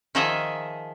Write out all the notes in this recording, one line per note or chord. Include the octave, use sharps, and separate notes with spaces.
D#3 F3 D#4 G#4 D#5 E5